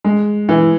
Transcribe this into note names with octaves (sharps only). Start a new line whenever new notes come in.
G#3
E3